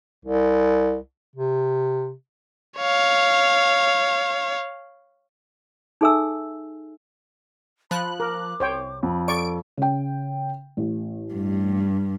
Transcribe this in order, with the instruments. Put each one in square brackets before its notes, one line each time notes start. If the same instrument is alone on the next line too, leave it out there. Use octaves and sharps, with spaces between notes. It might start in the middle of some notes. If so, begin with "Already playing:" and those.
[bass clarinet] C2
C3
[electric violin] C#5 F5
[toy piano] D#4 G#4 A4 E5 G#5 E6
[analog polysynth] F3 F#6 [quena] B5
[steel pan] A#4 [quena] D6
[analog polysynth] C2 [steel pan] C5 C#5 G5
[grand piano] F2 [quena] B5
[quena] A4 [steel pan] D5 C#6 [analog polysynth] D7
[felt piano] C#3 G5
A1
[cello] G2